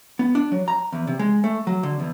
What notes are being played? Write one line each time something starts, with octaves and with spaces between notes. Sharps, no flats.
B3
D4
F#3
A#5
E2
C3
G#3
A3
F#3
D3
E2